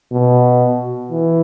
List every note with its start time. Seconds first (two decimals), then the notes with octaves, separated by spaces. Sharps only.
0.12 B2
1.12 E3